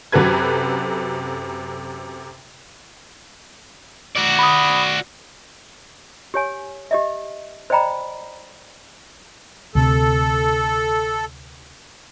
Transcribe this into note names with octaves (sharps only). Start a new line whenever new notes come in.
F#2 C3 F#4 A4 B4 G#6
F#4 D5
B5 D#6
G4 C#5 G#5
G4 D#5 E5
C5 D5 D#5 G5 A#5 B5
D2 C3 A4